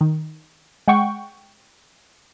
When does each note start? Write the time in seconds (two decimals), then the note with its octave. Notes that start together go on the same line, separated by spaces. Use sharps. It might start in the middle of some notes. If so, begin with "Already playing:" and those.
0.01 D#3
0.88 G#3 F#5 G5 C#6